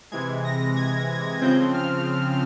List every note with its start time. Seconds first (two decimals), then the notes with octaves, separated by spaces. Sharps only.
0.12 C3 E3 G#3 G#6
0.45 A#6
0.76 G#6
1.41 C#3 F3 C4 G6
1.74 F6